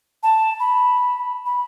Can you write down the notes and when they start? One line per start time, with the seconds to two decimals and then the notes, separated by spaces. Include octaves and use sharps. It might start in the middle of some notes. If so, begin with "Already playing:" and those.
0.23 A5
0.60 B5
1.46 B5